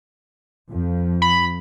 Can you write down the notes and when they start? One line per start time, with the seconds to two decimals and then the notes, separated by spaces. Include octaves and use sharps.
0.70 F2 F3
1.22 B5